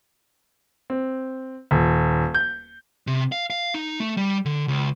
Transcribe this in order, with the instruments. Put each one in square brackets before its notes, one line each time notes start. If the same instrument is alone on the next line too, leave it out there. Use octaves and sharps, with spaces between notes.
[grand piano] C4
D#1
G6
[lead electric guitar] C3
F5
F5
D#4
A3
G3
D3
C#2